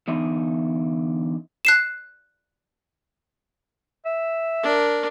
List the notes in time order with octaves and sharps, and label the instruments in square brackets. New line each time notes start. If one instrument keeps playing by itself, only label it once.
[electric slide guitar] D3 E3 B3 D#4 D#5 E5
[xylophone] F#6 C7 E7
[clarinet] E5
[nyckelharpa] D4 A#4